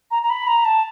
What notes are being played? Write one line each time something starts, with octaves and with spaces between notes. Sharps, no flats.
A#5
A#5
B5
A#5
A5